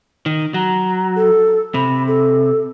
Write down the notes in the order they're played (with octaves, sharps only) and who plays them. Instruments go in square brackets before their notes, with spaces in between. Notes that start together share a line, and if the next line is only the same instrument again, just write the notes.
[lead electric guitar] D#3
[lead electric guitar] F#3 [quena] A#5
[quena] A4
[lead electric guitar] C3 [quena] B5
[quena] A4